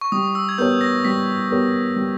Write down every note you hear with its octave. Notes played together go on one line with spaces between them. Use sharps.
C#6
G3 D#6
E6
G#6
B3 G4 A#4 C#5 G6
A#6
G3 B6
B3 G4 A#4 C#5
G3